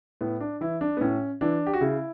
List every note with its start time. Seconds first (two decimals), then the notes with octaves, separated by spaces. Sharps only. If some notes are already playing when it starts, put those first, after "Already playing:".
0.21 A2 B3
0.40 D4
0.61 E3 E4
0.81 D4
0.97 B3
1.01 A2 C#4
1.41 E3 D4
1.67 G4
1.74 F#4
1.81 C#3 E4